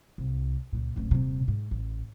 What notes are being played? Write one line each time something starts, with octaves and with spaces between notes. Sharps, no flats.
C2
C#2 A#2
D1 A1
D#1 C3
G#2
A1